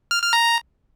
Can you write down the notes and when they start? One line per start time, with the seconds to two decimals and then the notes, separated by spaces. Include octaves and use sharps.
0.11 F6
0.22 F6
0.33 A#5